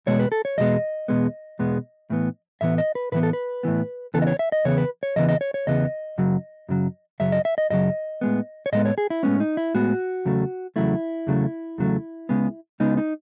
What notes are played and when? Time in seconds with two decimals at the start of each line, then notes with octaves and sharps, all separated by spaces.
0.06 E2 B2 G#3 B3 C#5
0.20 B4
0.32 A4
0.45 C#5
0.58 E2 B2 G#3 B3 D#5
1.08 E2 B2 G#3 B3
1.59 E2 B2 G#3 B3
2.10 A2 E3 B3
2.61 A2 E3 B3 E5
2.78 D#5
2.95 B4
3.12 A2 E3 B3 B4
3.23 A4
3.33 B4
3.63 A2 E3 B3
4.14 E2 C#3 E3 B3 A4
4.22 D#5
4.27 C#5
4.39 E5
4.52 D#5
4.65 E2 C#3 E3 B3 C#5
4.78 B4
5.03 C#5
5.16 E2 C#3 E3 B3 D#5
5.29 D#5
5.41 C#5
5.54 C#5
5.67 E2 C#3 E3 B3 D#5
6.18 F#2 C#3 F#3
6.69 F#2 C#3 F#3
7.20 F#2 C#3 F#3 E5
7.32 D#5
7.45 E5
7.58 D#5
7.70 F#2 C#3 F#3 D#5
8.21 A2 G#3 B3
8.66 C#5
8.72 A2 G#3 B3 D#5
8.85 C#5
8.98 G#4
9.10 E4
9.23 A2 G#3 B3 C#4
9.40 D#4
9.57 E4
9.74 A2 G#3 B3 F#4
10.25 E2 C#3 F#3 A3
10.76 E2 C#3 F#3 A3 E4
11.27 E2 C#3 F#3 A3
11.78 E2 C#3 F#3 A3
12.29 C#2 C#3 G#3 B3
12.80 C#2 C#3 G#3 B3 D#4
12.97 D#4